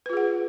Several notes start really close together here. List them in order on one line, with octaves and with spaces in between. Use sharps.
B4 F4 G#4 F#5